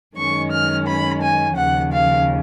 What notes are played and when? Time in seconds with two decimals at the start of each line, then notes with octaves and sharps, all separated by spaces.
0.16 F#2 D#3 G#3 C#4 C#6
0.51 F6
0.86 B5
1.22 G#5
1.56 D#2 C#3 F3 F#5
1.92 F5